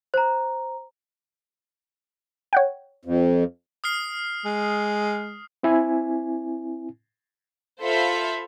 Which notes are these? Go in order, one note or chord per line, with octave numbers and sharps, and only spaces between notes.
C5 A#5
C#5 F#5 G5
F2
D#6 F6 C7
G#3
C4 E4 G#5
F4 A4 C5 E5 F5 B5